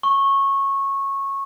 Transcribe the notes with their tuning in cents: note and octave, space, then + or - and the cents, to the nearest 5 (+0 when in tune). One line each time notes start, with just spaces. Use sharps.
C#6 -15